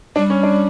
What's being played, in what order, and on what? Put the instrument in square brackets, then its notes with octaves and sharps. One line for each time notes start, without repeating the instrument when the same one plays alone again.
[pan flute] G3 [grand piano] D4
[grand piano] C#4
D4